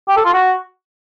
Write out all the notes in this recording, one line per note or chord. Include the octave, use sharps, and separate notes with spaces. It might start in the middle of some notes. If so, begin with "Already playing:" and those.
G4
A4
F4
F#4